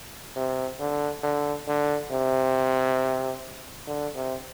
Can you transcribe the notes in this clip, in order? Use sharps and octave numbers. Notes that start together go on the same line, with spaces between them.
C3
D3
D3
D3
C3
D3
C3